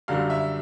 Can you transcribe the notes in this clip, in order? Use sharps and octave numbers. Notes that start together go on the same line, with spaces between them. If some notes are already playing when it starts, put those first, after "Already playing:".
F#2 D3 G3 F5
E5